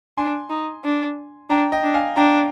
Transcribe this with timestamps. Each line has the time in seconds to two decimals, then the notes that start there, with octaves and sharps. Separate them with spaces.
0.17 D4 G#5 C6
0.50 D#4
0.84 D4
1.50 D4 G5 A#5
1.72 D#5 G5
1.83 D4
1.94 F5 G#5
2.16 D4 G5 A#5